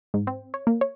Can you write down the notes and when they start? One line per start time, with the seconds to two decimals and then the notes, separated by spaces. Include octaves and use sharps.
0.14 G#2
0.27 C4
0.54 C#5
0.67 A#3
0.81 C#5